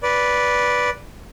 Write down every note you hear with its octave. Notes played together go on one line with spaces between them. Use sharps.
B4 D5